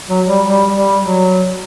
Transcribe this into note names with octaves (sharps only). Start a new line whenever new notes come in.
F#3
G3
G3
G3
F#3